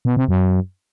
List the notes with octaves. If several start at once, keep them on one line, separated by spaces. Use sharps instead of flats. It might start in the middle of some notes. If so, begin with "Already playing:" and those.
B2
C3
F#2